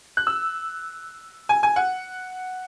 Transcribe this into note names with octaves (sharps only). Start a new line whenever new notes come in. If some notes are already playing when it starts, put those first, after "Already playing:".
F#6
E6
G#5
G#5
F#5